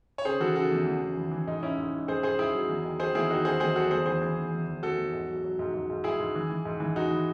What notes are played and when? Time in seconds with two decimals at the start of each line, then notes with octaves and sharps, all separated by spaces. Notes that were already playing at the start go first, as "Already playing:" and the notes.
0.18 C#5
0.25 C#3 G#4 C5
0.40 E3 F#4 A4
0.56 C#3 F#4 A4
0.72 E2
0.87 E2
1.01 E2
1.17 E3
1.31 E3
1.47 G#2 D#4
1.62 G#2 C#4 E4
1.78 G#2
1.93 G#2
2.08 G#2 G#4 C5
2.23 G#2 G#4 C5
2.39 G#2 E4 G#4
2.53 F#3
2.69 E2
2.85 D#3
2.99 D#3 G#4 C5
3.15 E2 E4 G#4
3.30 D#3 D#4 F#4
3.45 D#3 G#4 C5
3.60 E2 G#4 C5
3.75 F#3 F#4 A4
3.91 E2 G#4 C5
4.06 E3 G#4 C5
4.22 E3
4.37 E2
4.52 E2
4.67 E3
4.83 E2 F#4 A4
4.98 E2
5.14 G#2
5.28 F#3
5.43 F#3
5.59 G#2
5.74 G#2
5.90 G#2
6.04 G#2 E4 G#4
6.20 G#2
6.36 E3
6.50 E3
6.65 G#2
6.80 E3
6.96 G#2 D#4 F#4
7.11 E3